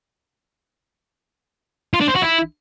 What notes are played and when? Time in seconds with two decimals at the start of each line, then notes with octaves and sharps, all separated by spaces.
1.94 F4
2.01 D4
2.08 C5
2.15 F#4
2.22 E4